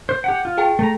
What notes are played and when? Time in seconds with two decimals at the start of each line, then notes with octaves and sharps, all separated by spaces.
0.09 C5
0.24 G4 F#5
0.45 F4
0.57 G#4 G5 A5
0.79 A3 A#5